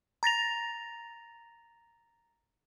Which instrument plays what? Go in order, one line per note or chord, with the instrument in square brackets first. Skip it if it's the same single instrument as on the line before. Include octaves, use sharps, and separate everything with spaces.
[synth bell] A#5 A6 A#6 F7